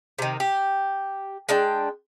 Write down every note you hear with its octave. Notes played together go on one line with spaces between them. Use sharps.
C3 D#3
G4
G#3 D4 G5